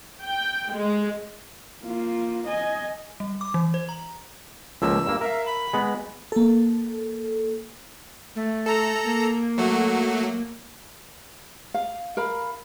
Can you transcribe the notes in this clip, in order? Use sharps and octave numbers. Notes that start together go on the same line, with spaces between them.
G5
G#3
A#3 F4
D#5 G#5
G3
D6
E3
C5
A#5
C#2 F3 A#3 E6
G2 A#3
A#4 E5 F5
B5
G#3 B3
A#3 A4
A3
A4 A#5
A#3
F#3 A3 F#4
F5
A#4 F5 B5